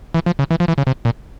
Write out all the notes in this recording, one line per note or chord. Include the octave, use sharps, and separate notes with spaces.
E3
F3
C#3
E3
F3
E3
C#3
C3
A#2